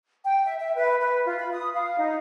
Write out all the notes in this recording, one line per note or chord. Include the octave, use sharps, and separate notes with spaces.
G5
E5
E5
B4
B4
F4
B5
D#6
F5
D#4